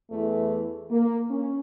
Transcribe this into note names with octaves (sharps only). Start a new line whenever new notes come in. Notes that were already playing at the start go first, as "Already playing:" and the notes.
E2 E3 A3
A#3
C#4